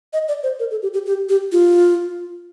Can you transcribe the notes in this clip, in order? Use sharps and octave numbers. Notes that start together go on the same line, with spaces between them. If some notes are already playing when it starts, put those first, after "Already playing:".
D#5
D5
C5
A#4
A4
G4
G4
G4
G4
F4